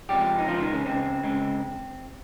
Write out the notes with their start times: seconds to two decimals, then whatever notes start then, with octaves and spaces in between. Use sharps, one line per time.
0.09 C#2 C3 F3 G3 G#3 G4
0.38 D#4
0.47 C#2 C#3 F3 G#3 F4
0.60 D#3 D#4
0.73 C#3 C#4
0.86 C#2 C#3 G#3 C4
1.23 C#2 C#3 G#3